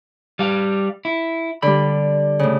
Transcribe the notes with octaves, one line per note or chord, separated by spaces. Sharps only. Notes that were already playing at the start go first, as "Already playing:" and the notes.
G3 F5
E4
D3 G3 B5
A2 C#3